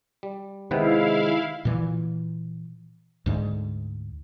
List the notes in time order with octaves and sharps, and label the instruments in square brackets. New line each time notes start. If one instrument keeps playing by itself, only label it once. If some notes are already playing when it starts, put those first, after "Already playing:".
[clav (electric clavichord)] G3
[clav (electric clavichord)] C3 B3 B4 [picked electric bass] D#3 [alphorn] G#3 [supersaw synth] E4 F5
[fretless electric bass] A#2 E3
D2 G#2